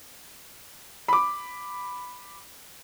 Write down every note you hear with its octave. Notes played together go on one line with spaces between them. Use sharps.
B5 D6